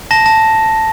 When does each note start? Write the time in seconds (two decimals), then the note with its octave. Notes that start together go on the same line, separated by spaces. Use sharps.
0.11 A5 A#6
0.26 A5